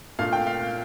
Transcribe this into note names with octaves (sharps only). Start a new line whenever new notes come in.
A#2 A3 D4 F5
G5
F5